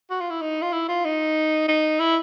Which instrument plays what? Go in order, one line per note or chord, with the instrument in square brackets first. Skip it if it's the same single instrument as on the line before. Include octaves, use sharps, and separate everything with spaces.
[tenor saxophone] F#4
F4
E4
D#4
F4
E4
F4
D#4
D#4
E4